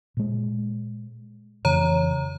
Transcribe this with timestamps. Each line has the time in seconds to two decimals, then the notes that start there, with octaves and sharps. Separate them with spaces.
0.17 A#2 G#3
1.65 F2 C#3 E3 C#5 A#5